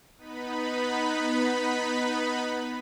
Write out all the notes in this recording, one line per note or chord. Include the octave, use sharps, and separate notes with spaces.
B3 D#4 B4 B5